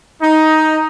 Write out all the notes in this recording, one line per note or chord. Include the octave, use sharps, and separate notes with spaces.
D#4